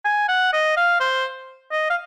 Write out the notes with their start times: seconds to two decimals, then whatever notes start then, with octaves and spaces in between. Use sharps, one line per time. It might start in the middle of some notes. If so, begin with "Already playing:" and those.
0.05 G#5
0.28 F#5
0.53 D#5
0.77 F5
1.00 C5
1.72 D#5
1.90 F5